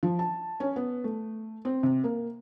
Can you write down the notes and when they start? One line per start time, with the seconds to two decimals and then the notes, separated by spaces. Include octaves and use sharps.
0.03 F3
0.19 A5
0.60 C#4
0.76 B3
1.04 A3
1.65 C4
1.83 C3
2.04 A#3